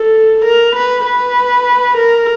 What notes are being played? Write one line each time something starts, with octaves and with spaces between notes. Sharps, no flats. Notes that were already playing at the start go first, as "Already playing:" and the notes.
Already playing: A4
A#4
B4
B4
A#4